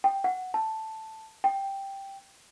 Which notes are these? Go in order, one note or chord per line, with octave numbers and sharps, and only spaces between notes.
G5
F#5
A5
G5